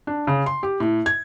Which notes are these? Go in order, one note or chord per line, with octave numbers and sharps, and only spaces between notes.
D4
C#3
C6
G4
A2
G#6